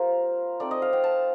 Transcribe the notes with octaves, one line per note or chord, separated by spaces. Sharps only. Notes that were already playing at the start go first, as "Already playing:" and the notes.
Already playing: G3 A#3 F4 A#4 C5
A3 C4 D#4 D5
D#5
F5
G5
A5